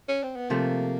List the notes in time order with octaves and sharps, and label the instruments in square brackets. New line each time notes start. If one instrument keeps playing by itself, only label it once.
[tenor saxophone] C#4
C4
B3
[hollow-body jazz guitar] C3 F3 A3 [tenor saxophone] A#3